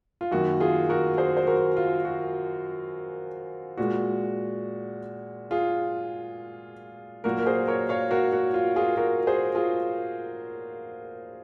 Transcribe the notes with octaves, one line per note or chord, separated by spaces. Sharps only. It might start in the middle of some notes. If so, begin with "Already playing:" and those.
F4
F#2 D#3 A#3 F#4
F4 G#4
F#4 A#4
G#4 C5
C5
F#4 A#4
F4
F#4
A#2 G#3 F#4
F4 G#4
A#2 F#3 A#3 F#4 A#4
A#4
G#4 C5
A#4 C#5
C#5 F5
F#4 A#4
F#4
F4
F4 G#4
F#4 A#4
G#4 C5
F4 G#4